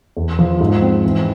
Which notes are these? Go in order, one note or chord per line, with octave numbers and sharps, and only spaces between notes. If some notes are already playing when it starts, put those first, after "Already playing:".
E2
F3
G#2
C4
E3